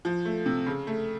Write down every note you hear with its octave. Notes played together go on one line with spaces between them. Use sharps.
F3
A3
C3
C#3
A3